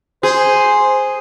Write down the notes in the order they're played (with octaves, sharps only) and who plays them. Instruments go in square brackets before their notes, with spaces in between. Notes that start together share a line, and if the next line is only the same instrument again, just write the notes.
[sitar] G#4 [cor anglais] C5